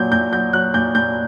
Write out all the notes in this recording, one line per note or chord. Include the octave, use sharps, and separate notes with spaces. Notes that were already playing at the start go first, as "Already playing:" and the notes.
Already playing: A#2 F#3 G6
A#2 G6
F#3 G6
F#3 F#6
A#2 G6
A#2 G6